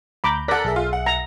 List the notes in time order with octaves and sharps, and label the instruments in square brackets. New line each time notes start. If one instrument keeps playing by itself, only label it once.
[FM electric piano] D2 A#5 G6 [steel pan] B5 D6
[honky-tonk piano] A4 A#4 [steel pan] D5 F#5 [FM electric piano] F#6 A#6 B6
[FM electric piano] B1 G#4 E5
[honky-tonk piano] F4
F#5
[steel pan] A#5